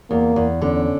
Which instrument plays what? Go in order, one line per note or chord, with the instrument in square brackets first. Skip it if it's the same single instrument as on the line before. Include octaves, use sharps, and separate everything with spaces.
[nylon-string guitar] E2 [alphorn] A#3
[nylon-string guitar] E2
[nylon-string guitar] D3 [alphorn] C#4